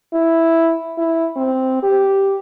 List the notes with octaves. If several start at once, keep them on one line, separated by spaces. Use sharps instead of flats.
E4
E4
C4
G4